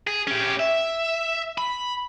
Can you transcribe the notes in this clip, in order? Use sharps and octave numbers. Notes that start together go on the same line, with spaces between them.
G#4
C#4 G4
E5
B5